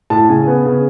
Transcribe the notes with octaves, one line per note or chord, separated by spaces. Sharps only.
A2 A5
C#3 G#5
B3
C#3